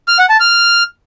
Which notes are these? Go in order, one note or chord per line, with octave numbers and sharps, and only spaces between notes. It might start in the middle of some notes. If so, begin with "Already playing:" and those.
F6
F#5
A5
F6